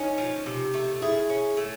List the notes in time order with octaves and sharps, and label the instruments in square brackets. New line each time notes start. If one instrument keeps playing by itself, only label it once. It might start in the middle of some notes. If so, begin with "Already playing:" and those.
Already playing: [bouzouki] C#4 [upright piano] D#4
[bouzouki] F3
C3
A3
[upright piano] E4 [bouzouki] G#4
[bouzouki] C#4
A3